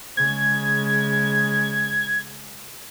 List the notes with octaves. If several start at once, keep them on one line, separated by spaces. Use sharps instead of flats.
C#3 G#3 G#6